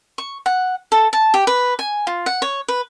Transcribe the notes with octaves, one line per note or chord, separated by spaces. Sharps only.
C#6
F#5
A4
A5
G4
B4
G#5
F4
F#5
C#5
B4